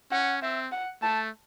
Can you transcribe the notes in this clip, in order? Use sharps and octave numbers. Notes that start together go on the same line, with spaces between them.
C#4 F#5
C4 E5
F#5
A3 A5